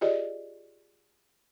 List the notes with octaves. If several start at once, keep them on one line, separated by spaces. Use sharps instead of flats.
F4 G4 G#4 C5 D5 D#5